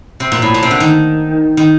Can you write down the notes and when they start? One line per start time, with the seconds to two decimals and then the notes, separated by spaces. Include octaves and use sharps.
0.20 C3
0.32 A#2
0.42 A2
0.54 A#2
0.63 C3
0.71 D3
0.80 D#3
1.57 D#3